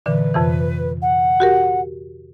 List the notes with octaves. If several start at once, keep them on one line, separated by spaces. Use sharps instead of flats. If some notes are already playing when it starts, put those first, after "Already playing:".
A#2 D3 E3 B4
F2 C3 E3
F#5
F#4 G4 A#4